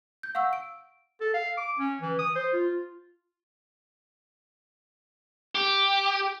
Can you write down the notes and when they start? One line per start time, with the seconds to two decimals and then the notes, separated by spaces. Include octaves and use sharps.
0.23 G6
0.35 F5 F#5 C#6 E6
0.53 D7
1.21 A4
1.34 F5
1.57 D6
1.79 C#4
2.01 E3
2.19 D#6
2.35 C5
2.53 F4
5.55 G4